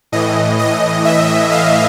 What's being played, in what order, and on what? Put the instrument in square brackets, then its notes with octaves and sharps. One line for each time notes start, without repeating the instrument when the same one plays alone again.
[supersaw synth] A2 E3 D#5
D#5
E5
F5